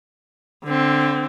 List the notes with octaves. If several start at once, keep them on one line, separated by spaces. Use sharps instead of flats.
D3 C4